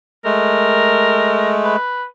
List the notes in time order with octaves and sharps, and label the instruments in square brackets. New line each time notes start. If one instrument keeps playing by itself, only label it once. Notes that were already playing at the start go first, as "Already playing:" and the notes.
[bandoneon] G#3 A3 [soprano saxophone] A#4
[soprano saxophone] B4